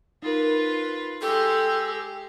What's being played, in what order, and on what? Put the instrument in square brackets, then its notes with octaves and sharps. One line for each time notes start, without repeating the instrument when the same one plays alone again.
[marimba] D#4 A#4 [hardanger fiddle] F4 B4
[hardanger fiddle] G#3 G4 [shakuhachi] A4